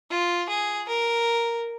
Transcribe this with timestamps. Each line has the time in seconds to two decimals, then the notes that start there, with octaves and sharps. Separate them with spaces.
0.10 F4
0.49 G#4
0.87 A#4